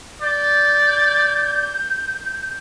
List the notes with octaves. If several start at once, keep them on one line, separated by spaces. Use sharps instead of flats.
D5 G6